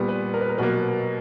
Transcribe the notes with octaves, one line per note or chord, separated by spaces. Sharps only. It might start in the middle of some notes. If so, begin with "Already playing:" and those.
Already playing: A#2 G3 B3
B4
A#4
B4
A#4
B2 F#3 A#3 B4